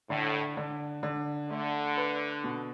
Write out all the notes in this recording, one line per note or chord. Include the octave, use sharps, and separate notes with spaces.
A2 D3
D3
D3
D3 A3
B4
B2